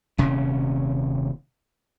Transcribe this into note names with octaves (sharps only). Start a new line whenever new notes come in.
D#1 C3 C#4